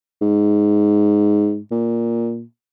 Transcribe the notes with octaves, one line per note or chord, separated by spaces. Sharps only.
G#2
A#2